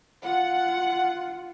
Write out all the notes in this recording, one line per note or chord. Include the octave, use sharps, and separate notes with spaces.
F4 F#5